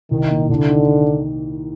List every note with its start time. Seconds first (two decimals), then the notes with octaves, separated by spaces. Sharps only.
0.11 C2 D#3
0.30 A#2
0.49 C2 D3
0.69 D#3